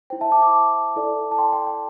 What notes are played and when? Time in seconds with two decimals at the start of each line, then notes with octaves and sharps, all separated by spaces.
0.10 E4 C5 G5
0.21 E5 A5
0.31 A5 D6
0.42 A5 D6
0.96 E4 A4 D5
1.31 A5
1.38 G5 C6
1.52 G5
1.67 G5